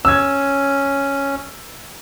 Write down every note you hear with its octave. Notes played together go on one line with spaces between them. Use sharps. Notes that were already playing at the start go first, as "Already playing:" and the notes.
C#4 E6 G#6